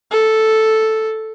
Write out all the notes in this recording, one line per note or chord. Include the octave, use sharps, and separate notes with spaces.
A4